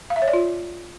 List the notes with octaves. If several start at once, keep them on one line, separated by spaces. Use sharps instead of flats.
F5
E5
C#5
D5
F4